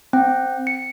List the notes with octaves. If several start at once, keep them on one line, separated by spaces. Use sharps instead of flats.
C4 G5
C#7